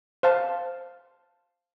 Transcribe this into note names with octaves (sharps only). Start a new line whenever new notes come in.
C5 F5 A5